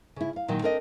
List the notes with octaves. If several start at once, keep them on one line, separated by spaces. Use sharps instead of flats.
C#3 E4
F5
A#2 D#3 F#3
C4 D4 A4 A#4 C#5 D#5